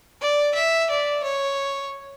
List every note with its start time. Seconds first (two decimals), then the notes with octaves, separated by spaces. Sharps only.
0.22 D5
0.55 E5
0.90 D5
1.24 C#5